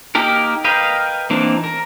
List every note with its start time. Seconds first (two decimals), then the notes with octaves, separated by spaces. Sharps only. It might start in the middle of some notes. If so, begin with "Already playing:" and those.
0.15 A#3 D#4 G4 A#4
0.65 A#4 B4 D#5 F5 G5
1.30 E3 A#3 C4 D4 D#4
1.64 A#4